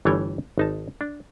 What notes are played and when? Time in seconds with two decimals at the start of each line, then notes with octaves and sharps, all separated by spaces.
0.05 G1 E3 G3 A3 C#5 G5
0.58 G#1 D#4 A5
1.01 D4